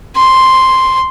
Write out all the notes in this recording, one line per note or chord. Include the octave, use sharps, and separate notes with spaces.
C6